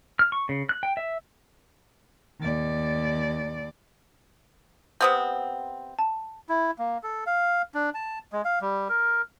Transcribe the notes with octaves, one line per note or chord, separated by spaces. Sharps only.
F6
C#6
C#3
F#6
G5
E5
D#2 D5
C3 B3 C4 D#6 G6
A5
E4
A#3
A4
F5
D4
A5
G#3
F5
G3
A#4